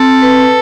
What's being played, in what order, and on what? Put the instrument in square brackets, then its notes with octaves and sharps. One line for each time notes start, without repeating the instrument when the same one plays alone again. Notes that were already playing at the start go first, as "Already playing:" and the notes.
Already playing: [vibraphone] C4 [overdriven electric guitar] A4
[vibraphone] B4